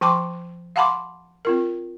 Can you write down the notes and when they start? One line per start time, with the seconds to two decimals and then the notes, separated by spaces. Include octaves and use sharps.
0.01 F3 G5 A5 C6 D6
0.76 F5 F#5 A5 B5 C6 D6
1.45 C4 F4 A#4